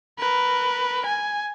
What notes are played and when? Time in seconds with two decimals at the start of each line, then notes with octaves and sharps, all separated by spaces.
0.19 A#4 B4
1.06 G#5